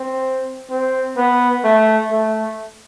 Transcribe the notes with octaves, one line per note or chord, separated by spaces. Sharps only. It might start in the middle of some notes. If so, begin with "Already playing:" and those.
Already playing: C4
C4
B3
A3
A3